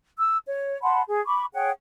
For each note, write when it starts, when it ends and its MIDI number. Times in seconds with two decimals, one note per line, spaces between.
0.19 0.37 88
0.47 0.78 73
0.82 1.01 78
0.82 1.01 81
0.82 1.01 83
0.82 1.01 84
1.08 1.21 68
1.26 1.45 83
1.26 1.45 85
1.26 1.45 86
1.53 1.70 68
1.53 1.70 73
1.53 1.70 78
1.53 1.70 79